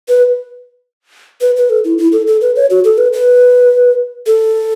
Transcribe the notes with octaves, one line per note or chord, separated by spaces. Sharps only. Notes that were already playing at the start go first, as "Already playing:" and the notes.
B4
B4
B4
A4
E4
E4
A4
A4
B4
C#5
F#4
A4
B4
B4
A4